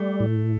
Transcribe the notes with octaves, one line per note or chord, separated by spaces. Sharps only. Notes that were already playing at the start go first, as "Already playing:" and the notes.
Already playing: G3 A3
A2